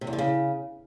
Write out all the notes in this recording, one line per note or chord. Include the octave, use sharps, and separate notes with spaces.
C3
E2
D3
C#3